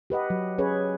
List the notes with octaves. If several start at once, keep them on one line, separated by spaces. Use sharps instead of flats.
G4 B4 D#5 F#5
F#3
C#4 G#4 B4 C#5